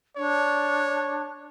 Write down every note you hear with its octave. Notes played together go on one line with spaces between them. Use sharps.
D4 C#5